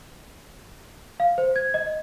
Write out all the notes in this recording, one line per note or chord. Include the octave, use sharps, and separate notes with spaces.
F5
C5
G#6
D#5